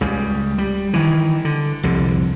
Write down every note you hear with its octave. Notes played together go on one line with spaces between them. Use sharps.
C#2 C#3 G3
G3
D#3 E3
D3
C2 F2 D3